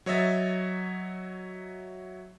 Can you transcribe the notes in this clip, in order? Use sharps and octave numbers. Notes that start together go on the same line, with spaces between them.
F#3 C#5 D#5 E5 A6